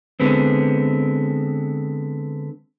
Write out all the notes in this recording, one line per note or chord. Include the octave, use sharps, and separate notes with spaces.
D3 G#3 B3 C4